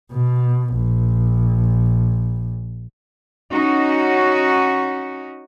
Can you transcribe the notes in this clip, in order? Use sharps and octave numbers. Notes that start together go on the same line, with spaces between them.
B2
A#1
C#4 D#4 F#4